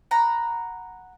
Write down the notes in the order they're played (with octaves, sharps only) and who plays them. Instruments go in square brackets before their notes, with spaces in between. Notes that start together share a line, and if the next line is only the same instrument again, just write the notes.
[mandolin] F#5 A#5 B5